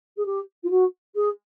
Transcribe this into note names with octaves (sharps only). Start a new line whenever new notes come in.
G#4
G4
F4
F#4
G#4